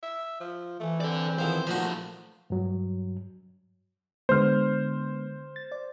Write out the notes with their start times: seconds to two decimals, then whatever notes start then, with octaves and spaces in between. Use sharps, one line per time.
0.03 E5
0.40 F3
0.80 E3 A3
1.00 C4 A4 D5
1.38 E2 D#3 F3 C5
1.67 A#2 F3 A3 F#4 C5
2.50 G2 F#3
4.29 D3 G#3 B3 C5 F6
5.56 A6
5.72 D5